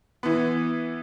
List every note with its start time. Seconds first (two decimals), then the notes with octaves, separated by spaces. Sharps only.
0.23 E3 B3